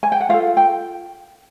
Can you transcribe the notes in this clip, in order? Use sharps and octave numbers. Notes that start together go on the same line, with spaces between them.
G#5
G5
F#5
F4 A4 F5
G5